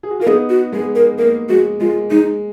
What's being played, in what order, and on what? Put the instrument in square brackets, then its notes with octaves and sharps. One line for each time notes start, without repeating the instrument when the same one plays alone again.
[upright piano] G#4
F#4
[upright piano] F4 [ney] A#4
[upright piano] B3 D#4 [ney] G#4
[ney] F#4
[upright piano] G#3 B3 [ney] G#4
[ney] A#4
[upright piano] A#3 [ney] A#4
[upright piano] G#3 [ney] F#4
[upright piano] G#3 [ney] F4
[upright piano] G#3 [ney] D#4